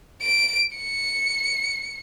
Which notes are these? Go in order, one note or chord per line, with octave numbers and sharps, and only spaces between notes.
D7
C#7